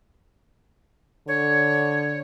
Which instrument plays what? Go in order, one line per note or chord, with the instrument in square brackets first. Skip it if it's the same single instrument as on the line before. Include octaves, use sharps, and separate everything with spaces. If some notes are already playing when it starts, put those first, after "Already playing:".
[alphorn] D3 [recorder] C#5